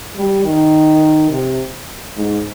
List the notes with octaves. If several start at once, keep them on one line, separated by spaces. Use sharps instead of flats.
G3
D#3
C3
G#2